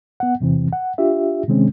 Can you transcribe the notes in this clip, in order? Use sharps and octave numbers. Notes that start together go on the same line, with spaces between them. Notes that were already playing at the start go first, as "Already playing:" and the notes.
B3 F#5
E2 C3 E3 C4
F#5
D4 F4 G4 E5
C3 D#3 G#3 C4 C#4